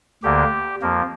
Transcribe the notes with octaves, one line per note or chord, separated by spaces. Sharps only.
D2 D3 A#3 G4
F2 F3 A#3